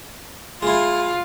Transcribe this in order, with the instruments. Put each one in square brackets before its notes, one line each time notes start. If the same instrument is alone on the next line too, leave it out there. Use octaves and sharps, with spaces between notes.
[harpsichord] G#3 E4 [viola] F4